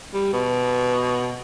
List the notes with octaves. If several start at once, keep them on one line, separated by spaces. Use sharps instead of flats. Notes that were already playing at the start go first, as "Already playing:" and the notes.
G3
B2